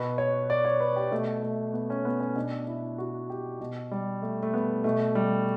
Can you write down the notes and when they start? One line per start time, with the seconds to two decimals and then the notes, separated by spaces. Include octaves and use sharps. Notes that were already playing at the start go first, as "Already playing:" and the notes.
Already playing: B2 B4
0.18 C#5
0.50 D5
0.65 C#5
0.80 B4
0.96 G4
1.11 B2 A3
1.43 A3
1.73 B3
1.90 C#4
2.05 B3
2.20 C#4
2.35 B2 D4
2.67 E4
2.98 F#4
3.30 G4
3.60 B2
3.91 G3
4.22 A3
4.43 A3
4.54 B3
4.84 B2 A3
5.15 G3